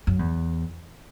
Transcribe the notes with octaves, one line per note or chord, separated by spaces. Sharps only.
F#2
E2